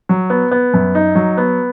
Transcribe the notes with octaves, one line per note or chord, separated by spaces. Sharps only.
F#3
B3
B3
F#2
D#4
F#3
B3